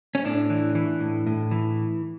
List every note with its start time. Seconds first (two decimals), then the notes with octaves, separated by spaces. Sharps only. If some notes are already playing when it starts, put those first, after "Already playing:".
0.15 C#4
0.25 A2 D4
0.50 E3
0.75 E3
1.00 A2
1.27 A2
1.51 E3